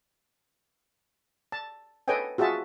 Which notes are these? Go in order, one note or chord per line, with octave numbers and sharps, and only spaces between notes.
A5
A4 B4 C#5 D#5 G5 G#5
F4 F#4 G#4 E5 A5